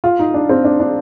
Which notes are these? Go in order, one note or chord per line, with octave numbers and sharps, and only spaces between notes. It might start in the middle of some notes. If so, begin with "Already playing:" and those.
F4
D#4
D4
C4
D4
D4